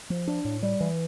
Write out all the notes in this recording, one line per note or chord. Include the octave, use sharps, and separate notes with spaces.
F3
D4
A2
G3
E3